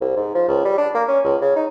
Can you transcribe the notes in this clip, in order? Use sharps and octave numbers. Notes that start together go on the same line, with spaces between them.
C2
G#2
F3
C#2
G3
D4
A#3
C#4
C#2
C#3
D#4